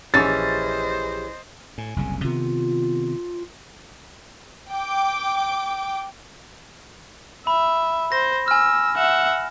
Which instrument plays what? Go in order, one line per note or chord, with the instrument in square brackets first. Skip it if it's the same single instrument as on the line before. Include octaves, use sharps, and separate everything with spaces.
[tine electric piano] A#1 G4 G#4 [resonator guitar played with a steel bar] E3 C#4 [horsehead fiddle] C5 D#5 [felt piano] A6
[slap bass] A2 [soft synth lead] G#5
[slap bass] F#1 C2 C#3
[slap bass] C3 D#3 B3 [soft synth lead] F4
[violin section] G5 D6
[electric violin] E5 [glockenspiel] B5
[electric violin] C5 [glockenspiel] A#6
[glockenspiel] G#5 F6 [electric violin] E6
[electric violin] E5 F#5 [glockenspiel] E7